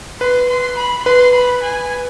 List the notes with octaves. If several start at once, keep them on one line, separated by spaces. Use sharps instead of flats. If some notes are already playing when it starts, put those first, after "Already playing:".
B4 C6
C6
B5
B4 C6
B5
G#5